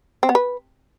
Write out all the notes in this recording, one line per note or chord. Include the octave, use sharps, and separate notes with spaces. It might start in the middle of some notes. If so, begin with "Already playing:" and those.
C4
B3
B4